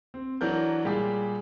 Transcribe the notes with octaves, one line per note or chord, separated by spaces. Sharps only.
C4
E3 F#3 D4 A#4 G6
A#2 G3 G#3 G4 G#4